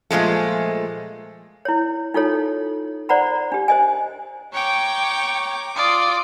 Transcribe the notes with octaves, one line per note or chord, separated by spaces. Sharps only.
A#2 F3 G#3 A3
E4 C#5
D#4 F4 A4 C#5
C5 D5 F#5 A#5 B5
D4 G4
C5 D#5 G#5
C#5 G5 A#5 D6
F4 D5 D#6